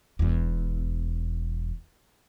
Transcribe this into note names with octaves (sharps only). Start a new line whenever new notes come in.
E1 E2